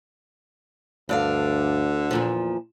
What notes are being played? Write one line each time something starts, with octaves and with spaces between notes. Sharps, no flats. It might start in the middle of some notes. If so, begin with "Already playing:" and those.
D2 G2 D3 D5 F5
E2 A#2 F3